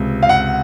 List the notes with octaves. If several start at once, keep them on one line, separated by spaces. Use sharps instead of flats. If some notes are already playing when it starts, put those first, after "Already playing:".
Already playing: C#2 C3
F5
F#5